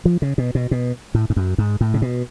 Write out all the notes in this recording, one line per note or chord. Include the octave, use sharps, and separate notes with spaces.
F3
C#3
B2
B2
B2
A2
G#2
F#2
G#2
A2
C#3
B2